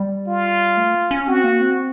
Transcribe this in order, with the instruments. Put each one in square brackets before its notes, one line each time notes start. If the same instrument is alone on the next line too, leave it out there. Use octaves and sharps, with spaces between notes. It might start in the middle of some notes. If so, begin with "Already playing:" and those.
Already playing: [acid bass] G3
[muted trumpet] F4
[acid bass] A3
C#4
[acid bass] C4 [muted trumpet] F#4
[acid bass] A#3
C4